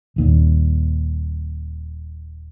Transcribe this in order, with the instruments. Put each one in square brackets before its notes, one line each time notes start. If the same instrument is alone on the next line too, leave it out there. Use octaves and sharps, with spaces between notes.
[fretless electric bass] D#1 D#2 A#2